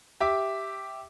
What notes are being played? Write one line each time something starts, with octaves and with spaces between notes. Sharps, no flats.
G4 E5 D6